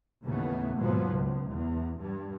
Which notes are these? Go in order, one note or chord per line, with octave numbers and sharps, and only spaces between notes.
D#2 A2 C#3 E3 A3 B3
D#2 G#2 B2 F3 F#3 B3
C#2
E2
G2